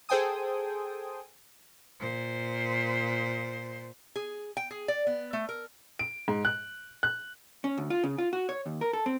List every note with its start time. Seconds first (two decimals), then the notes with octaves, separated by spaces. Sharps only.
0.09 G#4 A4 C5 G5 G#5 D#6
2.00 A#2 C5
4.16 G#4
4.57 G5
4.71 G#4
4.88 D5
5.07 B3
5.33 A3
5.49 A#4
5.99 D7
6.28 G#2
6.45 F#6
7.03 F#6
7.64 C#4
7.77 D2
7.90 F4
8.04 C#3
8.18 F4
8.33 F#4
8.49 C#5
8.66 D#2
8.81 A#4
8.93 A4
9.06 C4